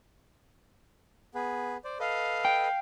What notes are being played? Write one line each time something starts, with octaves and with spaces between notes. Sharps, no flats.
B3 G#4 B4
C5 D5
A4 B4 D#5 F5
G5